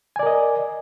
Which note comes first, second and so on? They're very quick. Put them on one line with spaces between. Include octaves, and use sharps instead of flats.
G#5 D5 A#4 D#5